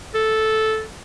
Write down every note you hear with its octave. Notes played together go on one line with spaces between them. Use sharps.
A4